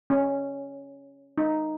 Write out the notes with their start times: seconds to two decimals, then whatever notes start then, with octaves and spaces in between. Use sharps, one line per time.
0.10 C#4
1.38 D#4